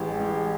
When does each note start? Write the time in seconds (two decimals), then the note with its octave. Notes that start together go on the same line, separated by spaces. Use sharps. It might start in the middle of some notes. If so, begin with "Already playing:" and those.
Already playing: A1 G#3 G4
0.20 G#3